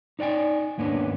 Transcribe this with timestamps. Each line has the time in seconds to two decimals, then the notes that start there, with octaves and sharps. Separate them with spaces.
0.19 D#4 C#5 D5 G5 G#5
0.78 D#2 G#2 A#3 B3 C#4 D4